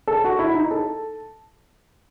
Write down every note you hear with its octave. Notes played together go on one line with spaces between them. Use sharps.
A4
F#4
E4
D#4
A4